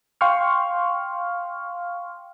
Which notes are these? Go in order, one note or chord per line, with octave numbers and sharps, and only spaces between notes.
F5 G5 C6 C#6 F6